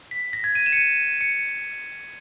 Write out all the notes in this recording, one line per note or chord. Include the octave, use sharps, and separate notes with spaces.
B6
A#6
G#6
D#7
E7
C#7
D#7
C#7